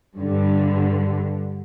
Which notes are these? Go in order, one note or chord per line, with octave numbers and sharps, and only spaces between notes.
G2 D3